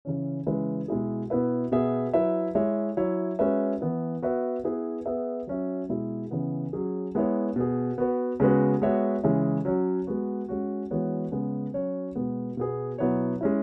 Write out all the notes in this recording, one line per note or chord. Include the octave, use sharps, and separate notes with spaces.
C#3 E3 C#4
C#3 E3 G#3 E4 B4
B2 G#3 E4 G#4
B2 B3 E4 B4 E5
B2 B3 G#4 E5
F#3 E4 B4 E5
G#3 E4 C#5 E5
F#3 E4 C#5 E5
G#3 C#4 F#4 B4 E5
E3 B3 E4
B3 F#4 B4 E5
B3 E4 G#4 B4
B3 G#4 B4 E5
F#3 C#4 F#4 E5
B2 G#3 E4 G#4
C#3 E3 B3
F#3 C#4 G#4
G#3 B3 E4 C#5
B2 B3 G#4
B3 F#4 B4
C#3 G#3 B3 F#4 B4
G#3 B3 F#4 C#5 E5
C#3 E3 G#3 E4 C#5
F#3 C#4 F#4 C#5
G#3 B3 F#4
G#3 C#4 F#4
E3 G#3 B3 F#4 C#5
C#3 G#3 B3
F#3 C#4 F#4 C#5
B2 G#3 B3
B2 B3 G#4
B2 F#3 B3 E4 C#5
G#3 C#4 E4